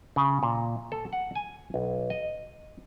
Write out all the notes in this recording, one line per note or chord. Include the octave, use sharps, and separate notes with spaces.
C#3
A#2
A4
F#5
G#5
B1
D#5